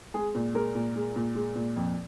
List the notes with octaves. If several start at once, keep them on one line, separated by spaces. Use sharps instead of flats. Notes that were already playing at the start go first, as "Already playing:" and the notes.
G#3 G#4
A#2
G#3 A#4
A#2
G#3
A#2
G#3
A#2
F2